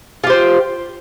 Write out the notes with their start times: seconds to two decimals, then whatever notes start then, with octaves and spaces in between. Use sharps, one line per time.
0.24 F4
0.27 G4
0.30 C5